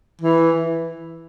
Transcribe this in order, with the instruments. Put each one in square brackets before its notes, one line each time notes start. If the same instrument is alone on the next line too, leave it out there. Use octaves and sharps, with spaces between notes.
[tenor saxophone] E3